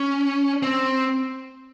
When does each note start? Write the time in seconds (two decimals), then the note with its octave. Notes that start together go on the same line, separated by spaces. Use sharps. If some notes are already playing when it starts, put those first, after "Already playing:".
Already playing: C#4
0.63 C4